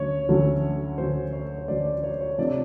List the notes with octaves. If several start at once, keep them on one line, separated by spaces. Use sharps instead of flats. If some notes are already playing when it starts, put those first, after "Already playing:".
Already playing: D2 D3 F#3 A3 C#4 C#5
D2 D3 F#3 A3 C#4
D2 D3 F#3 A3 C#4 C5
C#5
C#5
D2 D3 F#3 A3 C#4 D5
D5
C#5
C#5
C3 F3 A3 D4 D5